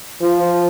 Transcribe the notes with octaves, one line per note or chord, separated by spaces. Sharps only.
F3